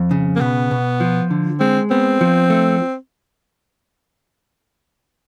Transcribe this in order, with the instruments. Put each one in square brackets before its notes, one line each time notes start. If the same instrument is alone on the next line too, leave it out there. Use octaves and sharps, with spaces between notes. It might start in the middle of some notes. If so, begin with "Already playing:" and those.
Already playing: [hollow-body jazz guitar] F2
C#3
[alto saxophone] A#3
[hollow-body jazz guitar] B2 [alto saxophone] B3
[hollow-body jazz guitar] B2
F3
D3
[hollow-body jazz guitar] G#3 [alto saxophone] C4
[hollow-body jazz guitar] B3 [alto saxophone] C4
[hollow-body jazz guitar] F3
A3